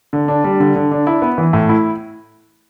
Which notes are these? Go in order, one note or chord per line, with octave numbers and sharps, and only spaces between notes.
D3
D4
G3
D3
D3
D4
E4
B3
E3
A2
E4